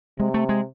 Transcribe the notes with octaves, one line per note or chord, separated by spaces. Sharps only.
C3 G#3
A3
G#3